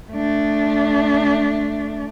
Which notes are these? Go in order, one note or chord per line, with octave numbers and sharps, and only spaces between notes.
A3 D4